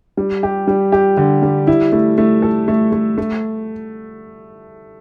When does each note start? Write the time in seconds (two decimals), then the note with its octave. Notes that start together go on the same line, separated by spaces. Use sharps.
0.17 G3
0.43 G4
0.67 G3
0.92 G4
1.17 D3
1.42 G3
1.67 E4
1.92 A3
2.18 A3
2.42 A4
2.68 A3
2.92 A3
3.18 A3